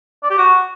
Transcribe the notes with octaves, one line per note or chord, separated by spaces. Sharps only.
D5
G4
F#4